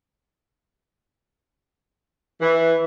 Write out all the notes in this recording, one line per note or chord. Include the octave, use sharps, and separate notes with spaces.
E3